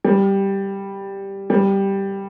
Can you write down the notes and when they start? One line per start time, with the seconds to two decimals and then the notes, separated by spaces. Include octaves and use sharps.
0.05 G3
1.50 G3